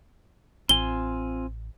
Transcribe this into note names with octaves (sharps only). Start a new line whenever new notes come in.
A1 C4 F4 G#5 G7